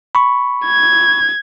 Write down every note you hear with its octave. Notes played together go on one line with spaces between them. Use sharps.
B5 C#6
G#6